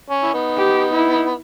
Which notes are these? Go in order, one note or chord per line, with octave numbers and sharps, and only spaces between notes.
C#4
E4
B3 D#4
G4
E4